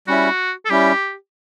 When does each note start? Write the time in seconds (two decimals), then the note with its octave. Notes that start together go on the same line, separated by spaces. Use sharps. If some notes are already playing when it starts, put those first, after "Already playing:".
0.07 G3 C#4 E4 F#4
0.65 A4
0.70 G3 C#4 E4 G4